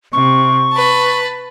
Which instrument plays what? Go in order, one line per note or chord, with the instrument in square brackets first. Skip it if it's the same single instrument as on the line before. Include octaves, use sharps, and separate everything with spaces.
[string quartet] C3 [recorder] C#6
[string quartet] B4 A5